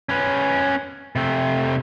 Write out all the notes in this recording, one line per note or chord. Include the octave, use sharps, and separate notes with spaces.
C#4 B4
C3 A3